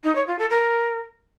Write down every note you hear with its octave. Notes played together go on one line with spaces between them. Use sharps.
D#4
C#5
F4
A4
A#4